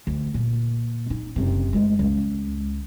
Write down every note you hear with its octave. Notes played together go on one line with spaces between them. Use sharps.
D2
A#2
D#4
F#1 C3
G#3 A3
C#2